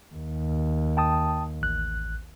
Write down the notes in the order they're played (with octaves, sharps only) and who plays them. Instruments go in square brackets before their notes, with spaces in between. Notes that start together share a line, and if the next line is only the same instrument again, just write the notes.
[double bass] D#2
[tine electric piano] G5 A5 D#6
A1 F#6